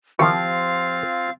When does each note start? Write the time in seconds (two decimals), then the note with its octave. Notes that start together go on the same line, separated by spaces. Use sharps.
0.19 D#3 F3 C4 E4 F4 G4 F5 C#6